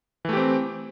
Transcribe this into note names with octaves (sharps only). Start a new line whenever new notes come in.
E3 A3 C4 G4